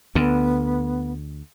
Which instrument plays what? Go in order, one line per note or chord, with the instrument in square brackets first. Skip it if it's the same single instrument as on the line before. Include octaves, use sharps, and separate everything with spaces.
[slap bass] D2 D3 [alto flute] B3